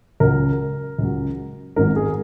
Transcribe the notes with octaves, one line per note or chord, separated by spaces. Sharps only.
C#2 C#3 F#3 A#4
C#2 C#3 F#3
G#1 G#2 D#3 F#3 A#4
G#4